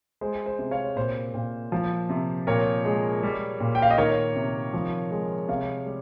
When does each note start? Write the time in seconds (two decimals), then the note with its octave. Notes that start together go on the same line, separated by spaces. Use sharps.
0.21 G#3 C5
0.46 C5
0.59 C3
0.71 C#5 F5
0.96 A#2 C5
1.34 A#2
1.72 F3
2.10 C3
2.47 A#2 A#4 C#5
2.85 G#3
3.23 G3
3.60 A#2
3.75 G5
3.82 F5
3.90 D#5
3.98 D#3 A#4 C#5
4.36 C3
4.74 F3
5.11 G#3
5.48 C3 C#5 F5
5.86 G3